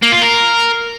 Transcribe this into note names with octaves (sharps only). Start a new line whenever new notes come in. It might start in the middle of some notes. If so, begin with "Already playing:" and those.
A#3
F4
A#4